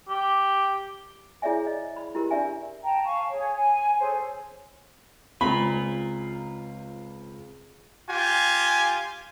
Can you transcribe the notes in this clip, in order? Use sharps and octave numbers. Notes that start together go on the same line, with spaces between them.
G4
E4 G#4 C#5 D5 E5 G#5
D#5
B5
E4 G4 A#4
D4 D5 E5 G#5
G5 A5 A#5
F5 G#5 A5 C#6
G#4 C#5
G#5
G#4 A4 C5 C#5
C#2 C4 F4 A#4 B5
F4 G4 G#5